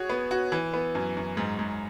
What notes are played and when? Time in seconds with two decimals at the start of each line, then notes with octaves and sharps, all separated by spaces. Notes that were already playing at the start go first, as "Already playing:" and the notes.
Already playing: F#4 G#4 C#5
0.10 B3
0.31 F#4
0.52 E3
0.74 B3
0.95 F#2
1.17 F#2
1.37 G#2
1.59 G#2